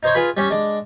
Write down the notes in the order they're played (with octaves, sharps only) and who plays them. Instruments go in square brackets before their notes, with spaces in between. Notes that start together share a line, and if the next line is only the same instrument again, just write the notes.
[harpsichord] D#4 C5 C#5
F4 G#4 B4 B5
G3 C#4
G#3 D4